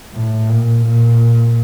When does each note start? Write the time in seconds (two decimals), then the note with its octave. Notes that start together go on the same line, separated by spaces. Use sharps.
0.14 A2
0.50 A#2
0.86 A#2